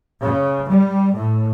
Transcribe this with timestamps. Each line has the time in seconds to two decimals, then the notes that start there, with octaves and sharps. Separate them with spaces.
0.22 C#3
0.69 G3
1.15 A2